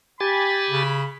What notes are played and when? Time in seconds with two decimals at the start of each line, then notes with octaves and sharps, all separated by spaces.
0.20 G4 G#5 B5 A6
0.70 C#3